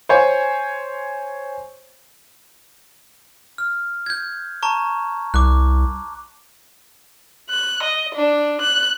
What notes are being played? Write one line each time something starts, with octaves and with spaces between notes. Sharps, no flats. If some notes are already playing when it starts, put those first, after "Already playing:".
C5 C#5 G#5
F6
G6 G#6
A5 A#5 C#6
C2 D6 F#6
F#6
D#5
D4
F#6